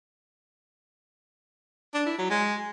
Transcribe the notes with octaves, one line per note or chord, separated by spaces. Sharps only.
D4
E4
F#3
G#3